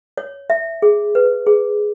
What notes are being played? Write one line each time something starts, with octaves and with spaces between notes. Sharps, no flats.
C#5
E5
G#4
B4
G#4